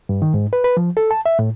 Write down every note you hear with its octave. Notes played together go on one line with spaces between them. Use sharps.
G2
D#3
G#2
B4
B4
F3
A4
A5
E5
A2